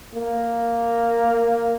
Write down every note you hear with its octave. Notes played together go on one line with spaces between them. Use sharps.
A#3